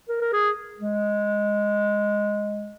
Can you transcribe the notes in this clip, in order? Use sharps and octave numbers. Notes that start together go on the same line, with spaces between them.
A#4
A#4
G#4
G#3